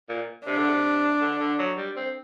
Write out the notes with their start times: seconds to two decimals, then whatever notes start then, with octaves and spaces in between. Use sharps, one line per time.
0.09 A#2
0.46 C3 D4
0.58 D3
0.69 C3
1.21 D3
1.40 D3
1.59 F#3
1.77 G3
1.96 C4